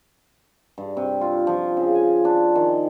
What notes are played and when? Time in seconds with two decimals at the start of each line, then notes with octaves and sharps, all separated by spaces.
0.78 G2
0.97 C3
1.21 F4
1.47 F3
1.77 C#3
1.95 G#5
2.25 D4
2.55 D#3